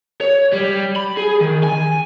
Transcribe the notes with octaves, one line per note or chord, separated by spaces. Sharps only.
C#5
G3
B5
G#4
D#3
G#5